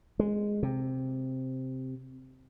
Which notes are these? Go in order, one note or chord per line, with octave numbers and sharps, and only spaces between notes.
G#3
C3